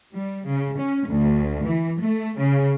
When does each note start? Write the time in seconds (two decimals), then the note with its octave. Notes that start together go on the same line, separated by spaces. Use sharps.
0.13 G3
0.46 C#3
0.79 C#4
1.08 D2
1.65 E3
2.00 A3
2.38 C#3